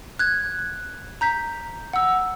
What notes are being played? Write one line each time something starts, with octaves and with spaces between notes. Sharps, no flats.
F#6 G#6
A#5 G6 B6
F#5 E6